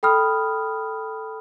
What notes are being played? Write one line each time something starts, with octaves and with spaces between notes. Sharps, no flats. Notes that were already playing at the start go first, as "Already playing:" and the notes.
A4 G5 B5 D#6 F6